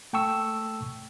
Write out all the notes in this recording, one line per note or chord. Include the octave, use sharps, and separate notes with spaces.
A3 G5 A5 C#6 E6